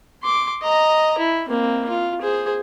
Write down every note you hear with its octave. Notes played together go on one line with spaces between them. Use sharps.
C6 D6
D#5 A#5
E4
A#3 C4
F4
G#4 C5